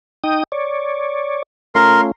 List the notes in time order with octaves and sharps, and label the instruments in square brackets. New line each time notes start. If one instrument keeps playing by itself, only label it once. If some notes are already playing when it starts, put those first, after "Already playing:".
[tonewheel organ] D#4 G5 D#6
C#5 D5
[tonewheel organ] A3 C#4 F4 [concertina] A#4 C6